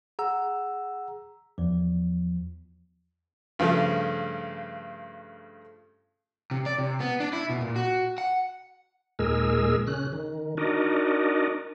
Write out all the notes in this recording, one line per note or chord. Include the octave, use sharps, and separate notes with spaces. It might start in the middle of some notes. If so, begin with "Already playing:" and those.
G#4 F#5 A#5 E6
E2 F3
G2 C#3 F3 A3
C3
D5
C3
B3
D4
E4
B2
A#2
F#4
F#5
D#2 A#2 G#3 G#4 A#4 E6
C#3 C#4 F#6
D#3
D4 D#4 F#4 A#4 D5 D#5